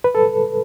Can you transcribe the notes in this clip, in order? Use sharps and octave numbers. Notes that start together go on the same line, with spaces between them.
B4
A4